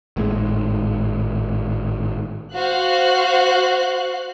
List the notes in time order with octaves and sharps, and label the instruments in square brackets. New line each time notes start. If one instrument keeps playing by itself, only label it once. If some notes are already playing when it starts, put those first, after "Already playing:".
[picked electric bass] G#1 A2 C3 G#3
[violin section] F#4 C5 F5 F#6